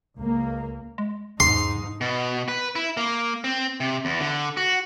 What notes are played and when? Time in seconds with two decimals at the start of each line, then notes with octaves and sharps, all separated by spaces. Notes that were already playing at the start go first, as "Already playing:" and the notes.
0.17 C#2 A#3
0.98 G#3
1.40 E2 G#2 D#4 C6
2.01 B2
2.48 B4
2.75 E4
2.97 A#3
3.44 C4
3.80 C3
4.05 E2
4.20 D3
4.57 F#4